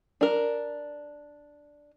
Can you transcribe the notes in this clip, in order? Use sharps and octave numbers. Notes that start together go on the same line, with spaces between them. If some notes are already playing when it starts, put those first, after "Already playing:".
D4 A#4